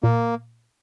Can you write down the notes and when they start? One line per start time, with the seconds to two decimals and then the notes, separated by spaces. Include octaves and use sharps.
0.03 A#2 A#3